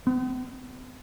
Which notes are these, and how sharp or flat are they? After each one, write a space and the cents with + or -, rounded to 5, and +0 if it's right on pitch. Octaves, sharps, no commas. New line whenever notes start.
B3 +45